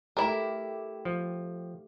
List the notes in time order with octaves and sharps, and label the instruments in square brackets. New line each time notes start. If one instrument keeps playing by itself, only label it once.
[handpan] A3 G4 [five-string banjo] E4 A#4
[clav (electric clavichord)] F3